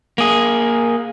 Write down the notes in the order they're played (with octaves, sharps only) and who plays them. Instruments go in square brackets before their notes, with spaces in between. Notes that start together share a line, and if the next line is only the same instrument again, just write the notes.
[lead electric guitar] A#3 G#4